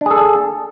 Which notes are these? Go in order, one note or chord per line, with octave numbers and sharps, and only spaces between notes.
D4 G#4 A4